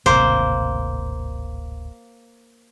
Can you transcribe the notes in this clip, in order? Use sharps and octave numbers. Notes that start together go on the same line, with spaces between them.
D1 G#1 C3 A#3 C5